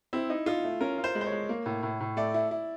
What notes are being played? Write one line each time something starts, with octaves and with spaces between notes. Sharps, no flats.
C4 E4
D#4
D#4 F4
A3
C#4 A#4
F4
C5
G#3
C5
C#5
G#3
A#3
A2
A2
A2
A3 D5
E4
E4